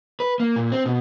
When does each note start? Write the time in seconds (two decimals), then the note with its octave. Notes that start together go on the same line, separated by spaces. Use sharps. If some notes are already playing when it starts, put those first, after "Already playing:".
0.20 B4
0.40 A#3
0.56 A#2
0.72 C4
0.86 B2